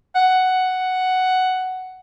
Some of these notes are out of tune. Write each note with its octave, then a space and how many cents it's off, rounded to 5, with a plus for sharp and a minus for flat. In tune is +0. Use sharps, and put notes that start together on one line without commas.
F#5 +5